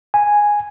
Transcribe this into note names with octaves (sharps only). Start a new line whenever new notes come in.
G#5